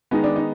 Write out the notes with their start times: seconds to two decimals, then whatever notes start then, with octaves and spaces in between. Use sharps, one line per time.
0.11 D#3 G#3 B3 D#4
0.24 D4
0.36 D#4